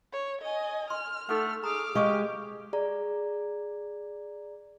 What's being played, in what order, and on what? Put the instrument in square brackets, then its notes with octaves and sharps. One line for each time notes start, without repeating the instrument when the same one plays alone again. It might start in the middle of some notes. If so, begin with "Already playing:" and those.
[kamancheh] C#5
D#5 G#5
[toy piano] C6 [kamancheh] F6
[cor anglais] A3 [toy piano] D#4 A4 F#5
[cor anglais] G#4 [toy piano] A#5 [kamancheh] D6 F6
[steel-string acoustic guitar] G#3 [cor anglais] G4 [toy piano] F5 C#6 E6
[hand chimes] G#4 D5 A#5